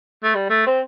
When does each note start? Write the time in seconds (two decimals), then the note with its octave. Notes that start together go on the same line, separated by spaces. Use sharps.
0.24 A3
0.35 G3
0.50 A3
0.67 C4